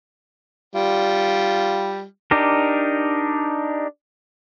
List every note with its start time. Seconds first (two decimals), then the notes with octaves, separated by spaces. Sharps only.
0.75 G3 F4
2.31 D4 D#4 G4 A#4